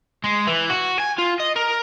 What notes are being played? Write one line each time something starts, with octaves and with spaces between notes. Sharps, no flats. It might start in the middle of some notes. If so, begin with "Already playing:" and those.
G#3
E3
F#4
G#5
F4
D#5
A#4